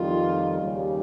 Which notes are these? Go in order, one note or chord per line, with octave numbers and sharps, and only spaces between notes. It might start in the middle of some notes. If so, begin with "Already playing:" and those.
Already playing: F2 D#3 G3 F4
D#2 C#3 G3